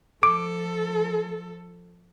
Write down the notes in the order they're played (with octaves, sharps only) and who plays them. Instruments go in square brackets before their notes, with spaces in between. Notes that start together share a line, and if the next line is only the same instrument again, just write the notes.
[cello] F3 A4 [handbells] D6 D7